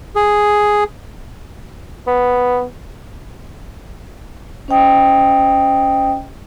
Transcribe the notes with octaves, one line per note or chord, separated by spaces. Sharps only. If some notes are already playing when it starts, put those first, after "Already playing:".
G#4
B3
C#4 C5 D#5 G5 D#6